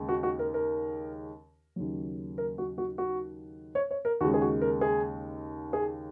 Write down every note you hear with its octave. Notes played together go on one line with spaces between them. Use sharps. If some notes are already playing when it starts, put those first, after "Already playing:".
Already playing: D#2 C#3 G#3
F#4
F#4
A#4
A#4
D#2 C#3 F#3
A#4
F#4
F#4
F#4
C#5
C#5
A#4
D#2 C#3 G#3 F#4
G#4
F#4
A#4
G#4
G#4